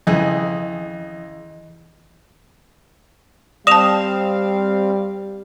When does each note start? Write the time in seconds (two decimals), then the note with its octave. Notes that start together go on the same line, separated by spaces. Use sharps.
0.07 F2 C#3 E3 E4 G#4 D#5
3.67 G3 C4 D5 F5 A5 D#6 E7 F7